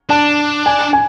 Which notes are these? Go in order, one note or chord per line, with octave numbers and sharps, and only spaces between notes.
D4 A5
G#5
G#5